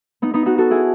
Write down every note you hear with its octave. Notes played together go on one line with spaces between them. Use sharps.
B3 D#4
B3 D#4
D#4 F#4
F#4 A4
E4 G#4